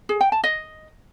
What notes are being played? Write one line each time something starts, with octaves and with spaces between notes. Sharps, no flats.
G#4
G5
A5
D#5